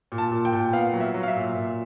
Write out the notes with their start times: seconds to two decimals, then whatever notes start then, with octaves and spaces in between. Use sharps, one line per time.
0.12 A#2
0.18 A5
0.31 A#2
0.45 G5
0.52 A#2
0.73 B3 F5
0.93 F#3
1.00 E5
1.14 F#3
1.23 F5
1.28 E5
1.35 A#2
1.55 A#2